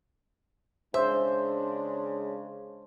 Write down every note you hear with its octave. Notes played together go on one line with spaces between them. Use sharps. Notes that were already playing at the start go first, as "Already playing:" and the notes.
C#3 G#3 D4 C5 E5